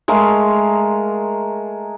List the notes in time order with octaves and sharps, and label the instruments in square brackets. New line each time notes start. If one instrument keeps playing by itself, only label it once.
[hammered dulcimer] G#3 A3 A#4 F5